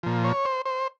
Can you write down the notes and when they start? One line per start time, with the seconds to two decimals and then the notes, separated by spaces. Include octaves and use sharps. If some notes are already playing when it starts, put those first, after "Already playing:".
0.03 A#2 F3
0.24 C#5
0.45 C5
0.66 C5